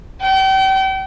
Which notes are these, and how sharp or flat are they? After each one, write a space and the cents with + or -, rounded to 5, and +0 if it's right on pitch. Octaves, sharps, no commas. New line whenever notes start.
G5 -35